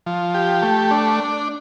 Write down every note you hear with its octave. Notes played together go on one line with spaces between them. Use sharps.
F3
G4
A3
D4